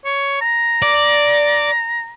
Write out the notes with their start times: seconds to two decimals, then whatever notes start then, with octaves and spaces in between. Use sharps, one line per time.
0.05 C#5
0.41 A#5
0.82 D5